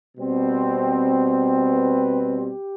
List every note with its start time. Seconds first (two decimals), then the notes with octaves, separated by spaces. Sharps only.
0.17 B2 G3 C4
1.64 B4
2.38 G4